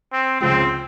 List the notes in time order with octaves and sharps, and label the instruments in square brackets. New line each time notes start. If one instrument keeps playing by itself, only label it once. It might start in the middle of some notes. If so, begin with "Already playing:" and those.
[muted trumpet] C4
[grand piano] C#2 C#3 F3 G#3 [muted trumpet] C4